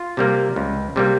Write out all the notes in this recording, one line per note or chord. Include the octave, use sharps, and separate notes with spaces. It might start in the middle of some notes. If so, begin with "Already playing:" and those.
Already playing: F4
C3 G3 A#3
C#2
C3 G3 A#3